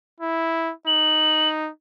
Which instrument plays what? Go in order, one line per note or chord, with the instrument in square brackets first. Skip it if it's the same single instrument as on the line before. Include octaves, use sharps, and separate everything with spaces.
[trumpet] E4
[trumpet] D#4 [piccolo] F#7